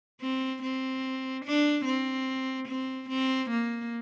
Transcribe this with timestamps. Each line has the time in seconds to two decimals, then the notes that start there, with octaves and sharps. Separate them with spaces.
0.21 C4
0.63 C4
1.45 D4
1.85 C4
2.68 C4
3.09 C4
3.50 A#3